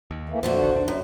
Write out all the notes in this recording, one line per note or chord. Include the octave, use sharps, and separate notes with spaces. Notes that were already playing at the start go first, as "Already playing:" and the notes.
D#2
E3 A3 A#3
F2 A#2 D3 A3 D4 F#4 C5
F1 B1 D#3
E2 D4
F#2